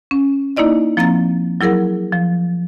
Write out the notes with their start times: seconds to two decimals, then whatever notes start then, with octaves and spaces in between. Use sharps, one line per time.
0.11 C#4
0.57 A#3 D#4 E4 D5 D#5
0.97 F3 A#3 C4 A#5 A6
1.61 F#3 E4 G#4 A#4 F#5
2.13 F3